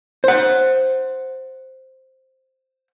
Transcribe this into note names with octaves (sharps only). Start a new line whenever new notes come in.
C5 F#5